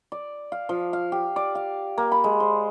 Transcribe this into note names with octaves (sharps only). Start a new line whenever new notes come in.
D5
F5
F3
F5
G4
D5
F5
A#3
B5
G#3
C5